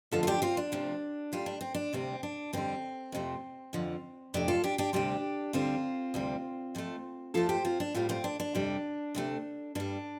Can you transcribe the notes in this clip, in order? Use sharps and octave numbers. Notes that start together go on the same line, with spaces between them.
F2 D3 F3 A3 F4 A4
F4
D4 G4
C4 F4
D4
D2 C3 F3
A2 G3 F4
D4
C4
D4
D2 C3 G3 C4
D4
F2 D3 G3 C4
F2 C3 F3 A3
F2 D3 F3
F2 C3 A3 D4
F4 A4
D4 G4
D4 G4
D2 C3 G3 D4 G4
D2 D3 G3 C4 F4
D2 C3 G3
F2 F3 A3
F2 F3 A3 F4 A4
G4 C5
C4 F4
D4
A2 G3 C4 F4
C4 F4
D4
D4
F2 C3 G3
D2 C3 A3
G2 G3 D4